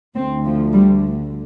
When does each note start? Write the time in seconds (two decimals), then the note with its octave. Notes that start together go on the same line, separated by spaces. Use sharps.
0.16 D2 D3 C4
0.45 F3
0.73 G3